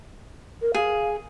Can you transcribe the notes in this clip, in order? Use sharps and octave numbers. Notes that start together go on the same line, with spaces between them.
A#4
G#4 F5